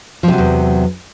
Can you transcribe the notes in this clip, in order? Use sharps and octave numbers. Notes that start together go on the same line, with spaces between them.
E2 C3 F3 F#3